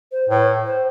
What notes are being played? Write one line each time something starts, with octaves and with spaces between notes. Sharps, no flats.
C5
A2 B4
C5